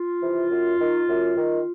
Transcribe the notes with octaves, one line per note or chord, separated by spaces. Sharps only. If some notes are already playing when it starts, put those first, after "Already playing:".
Already playing: F4
C3 E3
F#2
D#3
F#2
D#3